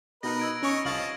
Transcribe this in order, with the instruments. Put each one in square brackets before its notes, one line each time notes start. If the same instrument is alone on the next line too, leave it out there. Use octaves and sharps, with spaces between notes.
[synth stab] B2 D#4 [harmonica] A#4 B4 D#5 [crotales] A#6
[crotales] E6 G#6 D7
[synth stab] C#4 C#6 [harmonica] C#5 D#5
[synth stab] C2 F5 A6 [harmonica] F3 D#5 [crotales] F#7